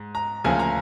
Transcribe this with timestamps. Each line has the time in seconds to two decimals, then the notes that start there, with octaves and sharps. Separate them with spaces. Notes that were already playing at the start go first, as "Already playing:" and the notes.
Already playing: G#2
0.15 A#5
0.44 D2 C#3 F3 A#3 G#5
0.59 A#5